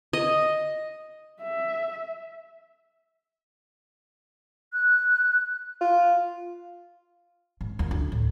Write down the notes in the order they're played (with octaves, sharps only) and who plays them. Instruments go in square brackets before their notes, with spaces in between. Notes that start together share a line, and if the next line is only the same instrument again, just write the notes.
[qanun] D#5
[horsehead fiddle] E5
[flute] F#6
[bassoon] F4
[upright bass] G#2
D#2
D2
A2